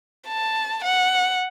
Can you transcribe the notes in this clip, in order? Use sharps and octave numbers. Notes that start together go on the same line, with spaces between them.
A5
F#5